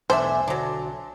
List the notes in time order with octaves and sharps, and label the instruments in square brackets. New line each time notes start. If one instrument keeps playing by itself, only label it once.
[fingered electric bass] B1 E2 [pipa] A3 D4 E5 [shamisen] C5 [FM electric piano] G#5
[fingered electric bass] B1 D3 [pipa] F#3 D4